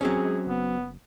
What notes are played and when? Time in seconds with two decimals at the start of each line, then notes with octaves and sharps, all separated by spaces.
0.01 E1 F#3 C4 C#4 G#4
0.25 G#3
0.47 F#1 B3